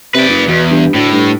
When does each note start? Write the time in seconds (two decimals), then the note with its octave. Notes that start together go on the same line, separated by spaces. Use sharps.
0.15 C3 B4 D5
0.29 F#1
0.48 E2 B2
0.70 G2
0.94 D2 A2
1.13 G2